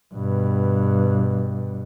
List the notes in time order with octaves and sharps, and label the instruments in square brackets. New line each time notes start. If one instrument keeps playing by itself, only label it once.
[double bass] G2 B2